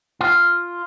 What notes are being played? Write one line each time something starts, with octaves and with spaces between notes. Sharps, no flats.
F4